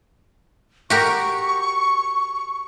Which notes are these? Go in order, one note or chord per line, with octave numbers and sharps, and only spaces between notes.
F#4 G4 A#4 C#6